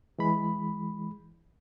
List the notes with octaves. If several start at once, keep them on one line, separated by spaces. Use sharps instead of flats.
E3 G#3 B5